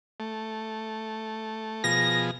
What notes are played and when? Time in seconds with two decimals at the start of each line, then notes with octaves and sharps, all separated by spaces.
0.20 A3
1.84 B2 F3 G#4 A#6